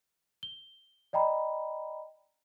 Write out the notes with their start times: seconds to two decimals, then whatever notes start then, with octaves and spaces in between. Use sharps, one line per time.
0.43 G7
1.13 D5 D#5 G5 A#5 B5